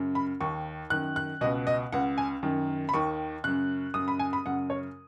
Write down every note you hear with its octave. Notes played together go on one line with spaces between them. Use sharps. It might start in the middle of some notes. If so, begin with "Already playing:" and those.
Already playing: F#2 C#3
B5
D#2 D#3 C#6
F#2 D#3 F#6
F#6
C#2 B2 D#5
D#5
C#2 C#3 F#5
G#5
F#2 D#3
B5
D#2 D#3 C#6
F#2 C#3 F#6
F#2 C#3 D#6
B5
G#5
B5
F#2 C#3 F#5
C#5